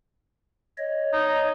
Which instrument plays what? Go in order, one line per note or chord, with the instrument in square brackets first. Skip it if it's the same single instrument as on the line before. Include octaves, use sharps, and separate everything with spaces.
[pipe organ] C#5 D#5
[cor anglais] D#4